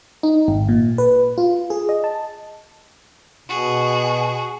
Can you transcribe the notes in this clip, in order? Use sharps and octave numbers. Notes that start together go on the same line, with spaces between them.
D#4
G#1
A#2
B4
F4
G#4
D#5
A5
B2 F#4 G#4